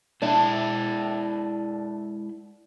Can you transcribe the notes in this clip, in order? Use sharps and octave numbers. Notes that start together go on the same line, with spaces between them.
G#3 D4 E4 E5